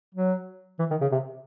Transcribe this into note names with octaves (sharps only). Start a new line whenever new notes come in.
F#3
E3
D#3
C#3
C3